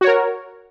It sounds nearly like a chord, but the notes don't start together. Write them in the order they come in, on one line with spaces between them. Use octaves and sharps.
F#4 C#5 A#4